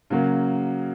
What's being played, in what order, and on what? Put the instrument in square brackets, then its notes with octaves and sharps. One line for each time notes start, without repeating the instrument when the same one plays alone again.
[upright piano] C#3 F#3 A#3